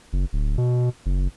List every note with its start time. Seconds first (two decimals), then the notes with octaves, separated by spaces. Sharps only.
0.13 F#1
0.33 D1
0.58 B2
1.06 F#1